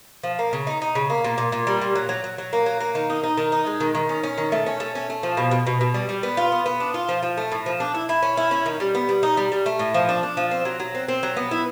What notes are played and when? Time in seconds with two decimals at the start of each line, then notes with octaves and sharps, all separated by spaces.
0.23 F3
0.39 A#3
0.53 C#3
0.67 D#4
0.82 D#4
0.95 C#3
1.10 A#3
1.24 A#2
1.38 A#2
1.52 A#2
1.67 G3
1.82 A#2
1.95 F#3
2.09 F#3
2.24 F#3
2.38 F#3
2.53 A#3
2.66 F#3
2.80 A#3
2.95 D#3
3.10 D#4
3.23 D#4
3.38 D#3
3.52 D#4
3.67 G#3
3.80 D#3
3.95 D#3
4.09 C#4
4.23 C#4
4.38 D#3
4.52 A3
4.66 C#4
4.80 A3
4.95 C#4
5.10 A3
5.23 F3
5.37 B2
5.51 B2
5.67 B2
5.81 B2
5.94 G3
6.09 G3
6.23 B3
6.37 F4
6.52 B3
6.66 B3
6.80 D4
6.94 F4
7.09 F3
7.23 F3
7.37 A3
7.52 A2
7.66 F3
7.80 D4
7.94 E4
8.09 E4
8.22 C#4
8.37 E4
8.51 C#4
8.66 D#3
8.80 G3
8.95 B3
9.09 G3
9.23 D#4
9.37 G3
9.52 G3
9.66 A3
9.79 A2
9.94 F3
10.09 D4
10.23 D4
10.37 F3
10.51 C4
10.65 F#3
10.80 F#3
10.95 C4
11.09 C4
11.23 F#3
11.37 B3
11.51 E4